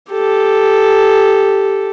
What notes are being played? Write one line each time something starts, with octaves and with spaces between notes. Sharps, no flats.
G4 A4